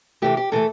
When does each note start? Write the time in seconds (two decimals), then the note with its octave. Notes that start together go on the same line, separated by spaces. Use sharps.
0.22 C3 E3 A3 G4
0.37 G4
0.52 C3 E3 A3 A4